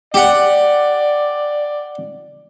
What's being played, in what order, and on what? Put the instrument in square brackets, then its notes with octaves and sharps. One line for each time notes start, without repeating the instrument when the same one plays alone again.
[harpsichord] G4 F#5 [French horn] D5